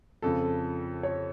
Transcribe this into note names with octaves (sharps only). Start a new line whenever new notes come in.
F2 C#3 F3 A4
C#5